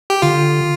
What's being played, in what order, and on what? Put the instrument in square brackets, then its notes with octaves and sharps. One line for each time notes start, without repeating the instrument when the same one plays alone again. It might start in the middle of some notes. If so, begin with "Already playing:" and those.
[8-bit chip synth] G4
[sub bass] D3 [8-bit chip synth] F4